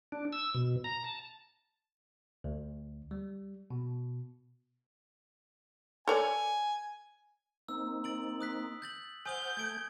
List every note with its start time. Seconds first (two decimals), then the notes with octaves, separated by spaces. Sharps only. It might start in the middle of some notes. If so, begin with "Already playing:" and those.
0.12 D4
0.33 E6
0.55 B2
0.84 A#5
1.04 A5
2.44 D2
3.11 G3
3.70 B2
6.08 A4 C#5 D5 G#5
7.69 A#3 C4 D#4 E6
8.04 A6 D7 F#7
8.41 D#6 F#6 B6
8.82 G6 A6 F#7
9.26 C5 F#5 G#5 D#6 F6 G6 G7
9.57 A3 G#6 D7